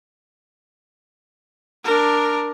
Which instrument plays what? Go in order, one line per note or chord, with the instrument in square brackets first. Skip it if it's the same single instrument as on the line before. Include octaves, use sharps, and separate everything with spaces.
[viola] D4 A#4